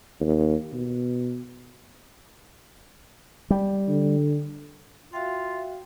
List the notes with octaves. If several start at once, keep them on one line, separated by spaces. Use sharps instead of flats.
D#2
B2
G3
D3
F4 F#4 E5 F5 G5